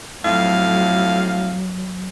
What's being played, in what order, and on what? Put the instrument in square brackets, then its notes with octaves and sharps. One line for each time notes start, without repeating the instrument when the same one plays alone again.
[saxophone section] F2 A2 F5 [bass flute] F#3